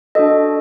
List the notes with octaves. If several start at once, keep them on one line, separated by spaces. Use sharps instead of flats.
D4 F#4 A4 D#5